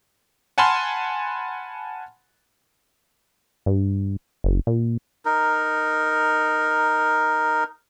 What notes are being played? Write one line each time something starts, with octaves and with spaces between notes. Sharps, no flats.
F#5 G#5 A5 B5 C6 F6
G2
F#1
A#2
D#4 A#4